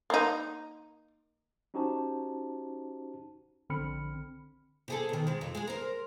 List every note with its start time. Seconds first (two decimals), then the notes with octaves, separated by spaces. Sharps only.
0.10 A#3 D#4
1.74 C#4 D#4 F#4 G4 C5 A5
3.70 A#1 D3 C4 B5 F6 C#7
4.88 C3 G#4 A4
5.09 B2 D#3
5.27 C3 G#3
5.41 F2
5.55 G#3 G#4
5.67 A#4 C5